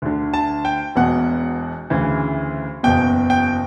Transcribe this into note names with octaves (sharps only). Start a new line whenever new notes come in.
D2 D3
A5
G5
E1 E2 B2 F#5
D2 C#3 E3
F#1 E2 B2 G5
G5